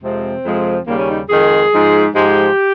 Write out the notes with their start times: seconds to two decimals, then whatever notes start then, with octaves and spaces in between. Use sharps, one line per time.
0.02 F2 C3 F3 G#3 C4
0.45 F2 C3 F3 G#3
0.87 D#2 C#3 G3 A#3
0.98 C#4
1.08 D#4
1.30 F2 D#3 G#3 G#4
1.73 G#2 F3 G#3
2.15 G#2 F3 G#3 G4